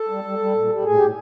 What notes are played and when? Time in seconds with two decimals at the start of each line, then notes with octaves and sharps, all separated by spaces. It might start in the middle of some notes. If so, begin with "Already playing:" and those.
Already playing: A4
0.09 G3
0.24 G3
0.39 G3
0.54 A#2
0.70 G3
0.84 A2 G#4
0.96 A2 G4